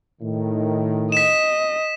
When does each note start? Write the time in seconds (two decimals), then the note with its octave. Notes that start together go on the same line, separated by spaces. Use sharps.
0.21 A2 D#3
1.12 D#5 B6 E7